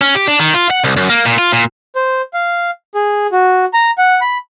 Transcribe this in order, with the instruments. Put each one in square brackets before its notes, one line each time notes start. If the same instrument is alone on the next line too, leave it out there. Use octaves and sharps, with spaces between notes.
[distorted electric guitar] C#4
G4
D4
D#3
F4
F#5
C2
F#2
A#3
A#2
F4
A#2
[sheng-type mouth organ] C5
F5
G#4
F#4
A#5
F#5
B5